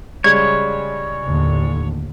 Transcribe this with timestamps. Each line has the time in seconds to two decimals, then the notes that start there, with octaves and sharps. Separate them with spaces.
0.24 C#3 G3 G#3 C#5 G#6
1.24 D#2 A2 D3